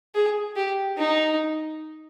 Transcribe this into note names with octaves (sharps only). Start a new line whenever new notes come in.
G#4
G4
D#4